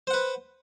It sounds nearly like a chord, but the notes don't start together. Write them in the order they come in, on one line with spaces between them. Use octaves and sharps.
C5 F#5 B4